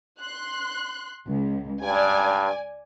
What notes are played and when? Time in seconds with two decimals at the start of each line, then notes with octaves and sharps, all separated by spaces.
0.20 C6 F#6
1.27 C#2
1.82 G2 D5 G#5